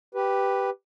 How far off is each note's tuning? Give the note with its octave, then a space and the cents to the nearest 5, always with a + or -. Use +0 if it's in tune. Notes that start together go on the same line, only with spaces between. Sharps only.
G4 +0 B4 +0